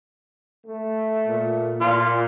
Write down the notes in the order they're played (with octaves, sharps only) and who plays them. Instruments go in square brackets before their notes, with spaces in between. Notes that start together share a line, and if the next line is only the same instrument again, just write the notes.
[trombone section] A3
[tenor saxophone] A#2
[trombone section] A#2 [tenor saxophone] F4